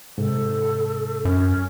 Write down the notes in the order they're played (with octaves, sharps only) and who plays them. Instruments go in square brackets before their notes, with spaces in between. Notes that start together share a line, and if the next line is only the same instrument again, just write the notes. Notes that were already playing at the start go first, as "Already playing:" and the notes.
[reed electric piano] G#2 C3 [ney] A4
[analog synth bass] F#2 [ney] C#4